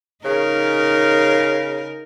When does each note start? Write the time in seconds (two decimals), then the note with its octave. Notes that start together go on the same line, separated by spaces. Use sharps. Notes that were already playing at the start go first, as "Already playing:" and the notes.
0.25 C#3 D#4 A#4